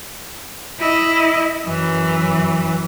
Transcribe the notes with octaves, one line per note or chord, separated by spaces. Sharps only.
E4 D#5
F#2 E3